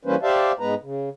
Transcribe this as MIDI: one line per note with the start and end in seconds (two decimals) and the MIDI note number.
0.05 0.16 52
0.05 0.16 55
0.05 0.16 58
0.05 0.16 61
0.05 0.16 71
0.05 0.16 72
0.22 0.52 67
0.22 0.52 72
0.22 0.52 74
0.22 0.52 76
0.22 0.52 77
0.22 0.52 81
0.60 0.75 44
0.60 0.75 56
0.60 0.75 59
0.60 0.75 71
0.60 0.75 82
0.82 1.09 49